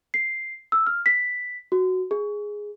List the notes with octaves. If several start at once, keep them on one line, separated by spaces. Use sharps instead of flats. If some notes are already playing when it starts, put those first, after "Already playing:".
C7
E6
F6
B6
F#4
G#4